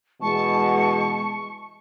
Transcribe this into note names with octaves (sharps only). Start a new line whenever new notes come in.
B2 E3 G#3 A5 C#6